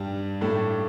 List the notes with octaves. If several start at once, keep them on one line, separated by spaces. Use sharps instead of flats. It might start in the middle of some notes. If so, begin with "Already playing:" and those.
Already playing: G2 G3
A2 A3